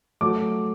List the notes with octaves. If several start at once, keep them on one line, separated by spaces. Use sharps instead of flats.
F#3 A3 D6